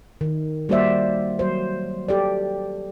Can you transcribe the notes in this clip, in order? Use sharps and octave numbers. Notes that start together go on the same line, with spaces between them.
D#3
G3 A#3 F#4 C5 D5 E5
F#3 C5
G4 A4 D5